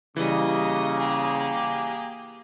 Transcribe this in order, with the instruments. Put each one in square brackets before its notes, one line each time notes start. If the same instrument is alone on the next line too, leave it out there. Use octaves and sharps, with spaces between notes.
[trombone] C#3 [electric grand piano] E3 G3 [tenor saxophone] A#3 [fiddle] D#5
[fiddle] G4 G#4